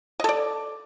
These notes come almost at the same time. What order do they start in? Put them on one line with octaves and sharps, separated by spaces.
D#5 A4 D5